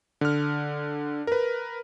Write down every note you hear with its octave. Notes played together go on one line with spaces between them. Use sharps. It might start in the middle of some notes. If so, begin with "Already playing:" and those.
D3 F6
A#4 B4